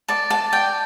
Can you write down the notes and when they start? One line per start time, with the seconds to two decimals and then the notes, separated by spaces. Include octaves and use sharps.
0.08 D5 A5
0.30 A5
0.53 D5 G5